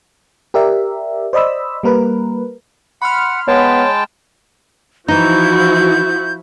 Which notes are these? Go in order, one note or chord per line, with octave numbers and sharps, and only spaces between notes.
G4 A#4 D5 E5
C5 D5 D#5 B5 E6
G3 A#3 A#4 B4
F#5 B5 C6 F6
G#3 B3 C#5 G5 A5
E3 F3 D#4 E4 F#4 G6